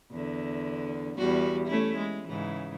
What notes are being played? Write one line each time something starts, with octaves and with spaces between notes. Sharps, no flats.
E2 D3
E2 G3 F#4
A3 C#4 E4
G#3
G#2 C#3 E3